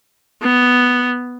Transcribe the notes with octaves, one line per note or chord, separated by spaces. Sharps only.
B3